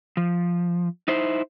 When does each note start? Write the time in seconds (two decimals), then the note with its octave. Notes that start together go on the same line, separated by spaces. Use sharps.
0.17 F3
1.08 D#4 E4 C5